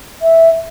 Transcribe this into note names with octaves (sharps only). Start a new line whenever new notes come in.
E5